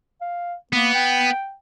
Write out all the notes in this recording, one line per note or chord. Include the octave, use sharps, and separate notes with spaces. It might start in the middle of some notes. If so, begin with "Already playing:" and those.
F5
A#3 B3
G5